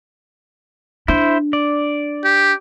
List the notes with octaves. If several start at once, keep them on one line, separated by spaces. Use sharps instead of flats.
D4 E4 C5
D5
G4